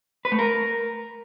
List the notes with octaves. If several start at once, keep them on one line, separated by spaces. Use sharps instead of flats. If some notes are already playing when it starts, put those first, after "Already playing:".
B4
A3
A#4